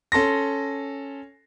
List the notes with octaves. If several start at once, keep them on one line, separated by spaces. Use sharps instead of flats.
C#4 A4 C6 A#6